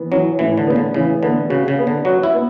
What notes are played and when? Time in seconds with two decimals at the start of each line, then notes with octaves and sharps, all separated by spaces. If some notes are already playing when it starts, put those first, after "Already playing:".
Already playing: E3 B3
0.12 E3 F#3
0.39 A2 E3
0.58 D3
0.67 C#3 B3
0.76 D3
0.94 C#3 E3
1.23 D3 B3
1.50 C#3 F#4
1.68 C#3
1.78 B3
1.87 D3
2.05 F#3 F#4
2.23 E4
2.34 B3